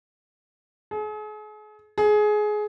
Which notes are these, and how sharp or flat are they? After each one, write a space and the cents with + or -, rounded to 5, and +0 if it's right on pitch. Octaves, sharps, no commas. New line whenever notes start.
G#4 +40
G#4 +20